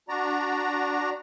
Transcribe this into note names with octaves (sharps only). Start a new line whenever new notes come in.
D4 F#4 D5 A#5